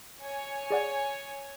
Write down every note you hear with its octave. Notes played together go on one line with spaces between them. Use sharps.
C#5 G#5
G#4 D5 F#5